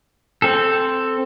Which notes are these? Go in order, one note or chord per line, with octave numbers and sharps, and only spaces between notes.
C4 A4